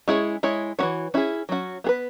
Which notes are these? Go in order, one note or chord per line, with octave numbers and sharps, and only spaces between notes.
G#3 C#4 E4 G#4 C#5
G#3 E4 C#5
E3 C#4 F#4 C#5
C#4 E4 G#4
F#3 C#4 F#4
B3 G#4 B4